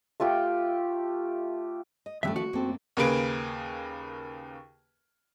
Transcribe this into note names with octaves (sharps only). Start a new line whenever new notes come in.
A3 F4 G4 G5
D#5
D2 G2 D#3 F3 A3 C#4 E5
F#4
F#2 A3 A#3 C4 C#4 A4
D#2 C#3 A#3 G#4 B4 D7